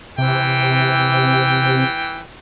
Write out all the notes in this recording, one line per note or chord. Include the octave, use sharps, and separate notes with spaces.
C3 E3 G5